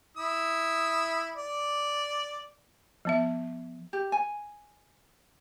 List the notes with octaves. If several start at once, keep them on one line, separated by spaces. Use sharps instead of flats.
E4 D#6 E6
D5
F3 B3 E5
G4
G#5